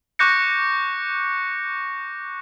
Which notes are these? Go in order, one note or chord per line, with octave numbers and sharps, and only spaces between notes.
C#6 D6 F#6 G6 A#6 C#7